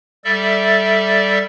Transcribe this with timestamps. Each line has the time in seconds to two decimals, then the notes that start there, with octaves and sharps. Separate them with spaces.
0.24 G3 A4 D5 E5